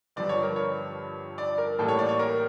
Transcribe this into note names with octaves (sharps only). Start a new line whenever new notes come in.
G1 G2 F3 D5
C#5
A#4
C#5
D5
A#4
A1 A2 G3 A#3 A4
C#5
D5
C#5
A#4